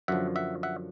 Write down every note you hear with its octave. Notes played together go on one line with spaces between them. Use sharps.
F#2 D3 F3 E5 F#5
E5 F#5
E5 F#5